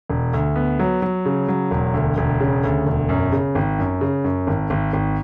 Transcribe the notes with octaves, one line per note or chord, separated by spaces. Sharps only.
E1
D2
B3
F#3
F#3
C#3
F#3
E1
D2
E1
C#3
D2
E1
F#2
C#3
G#1
F#2
C#3
F#2
G#1
G#1
G#1